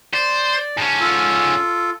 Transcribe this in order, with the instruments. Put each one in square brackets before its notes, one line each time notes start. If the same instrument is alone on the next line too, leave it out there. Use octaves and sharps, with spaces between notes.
[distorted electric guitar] C5 [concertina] D5
[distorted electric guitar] G#2 C#4 [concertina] A5
[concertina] F4 A4